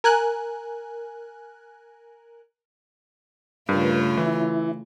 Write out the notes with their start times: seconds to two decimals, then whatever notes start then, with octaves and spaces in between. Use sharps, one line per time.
0.04 A#4 G#5 F#6
3.69 G2 C#3 A3 F4 A#4 B4
4.17 E3 E4